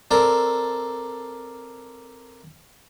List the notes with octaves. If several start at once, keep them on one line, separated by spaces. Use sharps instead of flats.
C4 A4 A#4 D5 A#5